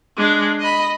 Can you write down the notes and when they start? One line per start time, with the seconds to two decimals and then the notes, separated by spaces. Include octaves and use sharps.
0.17 G#3 D4
0.60 D#5 B5